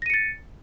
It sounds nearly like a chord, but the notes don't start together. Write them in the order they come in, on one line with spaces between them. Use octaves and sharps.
A#6 D#7 C#7 A6